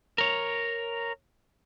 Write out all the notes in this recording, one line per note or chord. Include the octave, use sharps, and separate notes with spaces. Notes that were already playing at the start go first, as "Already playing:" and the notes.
A#4 C#5